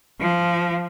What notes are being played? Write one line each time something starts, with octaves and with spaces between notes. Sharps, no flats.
F3